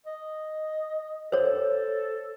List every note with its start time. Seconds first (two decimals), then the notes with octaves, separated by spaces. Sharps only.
0.06 D#5
1.32 A4 C5 C#5